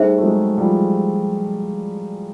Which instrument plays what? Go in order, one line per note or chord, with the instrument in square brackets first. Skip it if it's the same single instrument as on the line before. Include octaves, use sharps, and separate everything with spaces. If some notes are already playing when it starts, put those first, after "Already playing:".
Already playing: [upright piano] G3 A3 [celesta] D#4 G#4 C5 E5
[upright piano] A3
F#3 G#3
F3 G3